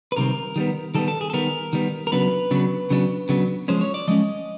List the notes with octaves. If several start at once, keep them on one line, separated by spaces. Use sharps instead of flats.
B4
C3 D#3 G3 C4 A#4
D#3 G3 B3
D#3 G3 B3 A4
A4
G#4
A4
D#3 G3 B3 A#4
D#3 G3 B3
A#4
C#3 F#3 B3 D4 B4
C#3 F#3 B3 D4
C#3 F#3 B3 D4
C#3 F#3 B3 D4
F3 G#3 C#4 C5
C#5
D5
F3 G#3 C#4 D#5